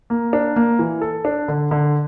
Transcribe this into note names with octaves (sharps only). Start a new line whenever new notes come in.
A#3
D4
A#3
E3
A4
D4
D3
D3